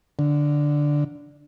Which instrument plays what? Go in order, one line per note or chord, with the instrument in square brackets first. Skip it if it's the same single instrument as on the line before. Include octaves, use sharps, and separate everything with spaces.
[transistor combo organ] D3